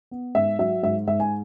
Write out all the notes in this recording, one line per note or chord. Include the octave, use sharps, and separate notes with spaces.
B3
G#2 E5
F#3 E5
G#2 E5
G#2 E5
G#5